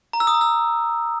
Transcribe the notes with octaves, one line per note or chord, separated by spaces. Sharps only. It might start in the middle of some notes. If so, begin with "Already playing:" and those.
A#5
E6
D#6
A#5
E6